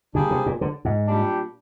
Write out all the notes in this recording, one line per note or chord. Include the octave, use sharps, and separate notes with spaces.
D3 G3 A#3 D4 G#4
C3
A#2
D3
G#2
A#2 G3 D4 G4